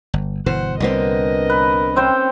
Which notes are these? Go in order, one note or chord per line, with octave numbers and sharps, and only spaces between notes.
G1
G1 B2 E3 C5 F#5
C2 A#2 D3 B3 C4 A#4 D#5
B4
C4 C#4 C5 G5